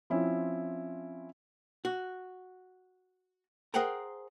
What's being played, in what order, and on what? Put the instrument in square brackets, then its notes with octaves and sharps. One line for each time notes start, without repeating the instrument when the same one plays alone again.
[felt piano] F3 C4 C#4 E4
[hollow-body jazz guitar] F#4
G#4 A#4 C5 F#5 G5 A#5